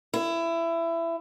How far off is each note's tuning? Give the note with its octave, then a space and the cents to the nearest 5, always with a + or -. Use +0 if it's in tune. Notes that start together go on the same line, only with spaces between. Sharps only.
E4 +20